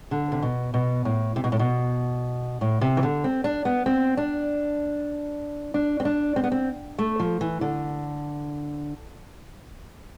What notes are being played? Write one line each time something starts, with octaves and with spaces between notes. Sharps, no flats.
D3
C3
B2
B2
A2
C3
B2
A2
B2
A2
C3
E3
D3
C4
D4
B3
C4
D4
D4
C4
D4
C4
B3
C4
A3
F3
E3
D3